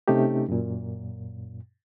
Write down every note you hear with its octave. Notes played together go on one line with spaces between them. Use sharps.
C3 A3 C#4 D#4 G4
F#2 A#2